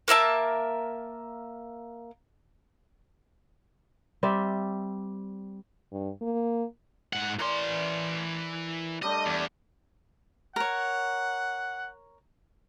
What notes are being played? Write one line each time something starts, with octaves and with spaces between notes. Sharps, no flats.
A#3 A#4 E5 A5
G3 C4 D5 E5
G2
A#3
G#2 F#5
E3 A#4 D5 G#5 C6
G3 A3 D4 D#5
E2
A#4 C#5 F#5